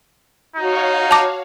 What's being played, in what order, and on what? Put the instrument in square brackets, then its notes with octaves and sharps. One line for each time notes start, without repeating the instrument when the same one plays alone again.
[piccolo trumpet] D#4 [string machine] F#4 C#5 F5
[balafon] A5 D6